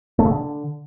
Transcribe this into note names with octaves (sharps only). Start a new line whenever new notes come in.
A3
C#3
D3